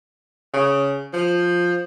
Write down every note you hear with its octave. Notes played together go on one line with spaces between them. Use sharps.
C#3
F3